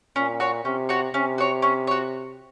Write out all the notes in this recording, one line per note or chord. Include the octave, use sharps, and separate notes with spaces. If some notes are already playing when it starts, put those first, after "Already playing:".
A#2 C#4
F#4 C#5
C3 C#4
F#4 C#5
C3 C#4
F#4 C#5
C#4
F#4 C#5